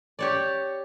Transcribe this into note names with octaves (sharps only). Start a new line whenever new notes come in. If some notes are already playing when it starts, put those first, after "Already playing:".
G4 C#5 D5